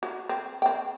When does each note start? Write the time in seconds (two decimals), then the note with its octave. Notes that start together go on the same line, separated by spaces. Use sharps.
0.03 F#4
0.29 C4
0.62 C4 G5